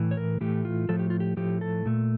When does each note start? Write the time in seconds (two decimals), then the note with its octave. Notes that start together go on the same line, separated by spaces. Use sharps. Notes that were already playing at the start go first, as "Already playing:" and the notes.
Already playing: A2 E3 A3
0.11 C#5
0.17 A#4
0.41 A2 E3 A3 G4
0.65 F4
0.89 A2 F3 A3 A4
0.99 G4
1.10 F4
1.20 G4
1.37 A2 F3 A3 G4
1.61 A4
1.85 A#2 A3